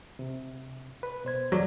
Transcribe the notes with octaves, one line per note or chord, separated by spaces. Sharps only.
C3
B4
B2 C5 G#6
F2 F#3 D5